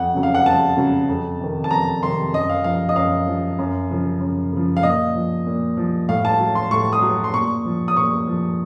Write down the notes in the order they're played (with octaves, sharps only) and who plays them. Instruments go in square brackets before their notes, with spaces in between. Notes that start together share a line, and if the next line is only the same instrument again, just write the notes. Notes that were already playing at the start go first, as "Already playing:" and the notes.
Already playing: [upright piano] F2 F#5
C#3 F#3
F5
F#5
F2 A5
C#3 F#3
F2
C3 D#3
A5
F2 A#5
C3 D#3 C6
F#2 D#5
F5
F3 F5
D#5
F#2 F5
F3
F#2
C#3 F3
F#2
C#3 F3
F5
A#2 D#5
F3
A#2
F3
A2 F5
A5
F#3
C6
A2 C#6
D#6
F#3
C6
A#2 C#6
F3
D#6
A#2 C#6
F3